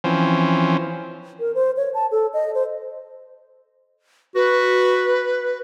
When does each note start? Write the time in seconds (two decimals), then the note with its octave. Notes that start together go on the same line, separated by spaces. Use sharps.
0.04 E3 F3 C4 C#4
1.40 A#4
1.55 C5
1.77 C#5
1.94 A5
2.11 A4
2.33 D#5
2.54 C5
4.35 F#4 B4